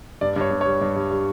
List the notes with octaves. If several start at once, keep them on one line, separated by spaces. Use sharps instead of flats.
G2 D5
G2 C#5
G2
C#5
G3
G2
G2
G3